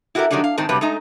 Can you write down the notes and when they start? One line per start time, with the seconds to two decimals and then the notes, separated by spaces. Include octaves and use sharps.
0.15 E4 F#4 G4 A4 A#4
0.31 D#3 F#3 G3 A3 D4
0.44 F5
0.58 G#2 D#3 C4 A5
0.69 G2 C3 F#3 G3 B4
0.81 G#3 A3 D#4 A#5